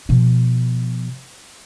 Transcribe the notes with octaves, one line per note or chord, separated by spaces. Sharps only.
B2 F3